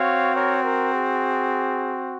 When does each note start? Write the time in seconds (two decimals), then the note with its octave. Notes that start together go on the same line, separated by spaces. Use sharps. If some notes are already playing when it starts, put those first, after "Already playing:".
Already playing: C4 F#4 C#5 F5
0.35 A#4 C#5
0.63 A#4
0.92 G#4